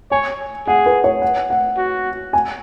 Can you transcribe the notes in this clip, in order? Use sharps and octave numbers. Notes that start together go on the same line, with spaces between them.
C#5 G#5
G#4 F#5
B4
C#5
F#5
F#5
F#4
G#5